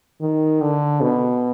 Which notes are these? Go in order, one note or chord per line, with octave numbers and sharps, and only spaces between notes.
D#3
D3
B2